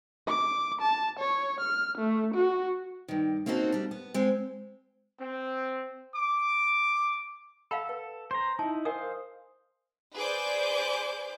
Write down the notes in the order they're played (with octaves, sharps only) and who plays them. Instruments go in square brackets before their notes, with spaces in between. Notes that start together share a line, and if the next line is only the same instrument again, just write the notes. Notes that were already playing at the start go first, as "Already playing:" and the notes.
[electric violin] D6
A5
C#5
F6
A3
F#4
[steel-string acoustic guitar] G2 D#3
A#3 C4 C#4 D#4 F#4 A4
G3 D4
B3
G#3 C4
[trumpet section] C4
D6
[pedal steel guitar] A4 [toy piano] F5 F#5 B5
[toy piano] B4
[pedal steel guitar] C5 A#5
[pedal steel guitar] D#4 E4 [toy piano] A5
[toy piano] A#4 D#5 G#5 [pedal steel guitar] C5 F5 D#6
[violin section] G#4 B4 C5 D5 D6 G6